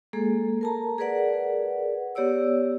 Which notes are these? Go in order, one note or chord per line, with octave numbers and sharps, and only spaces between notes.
G#3 A#3 G#4 A4
A#4 A5 A#5
G#4 A#4 B4 D5 F#5
B3 G4 C#5 D5 E6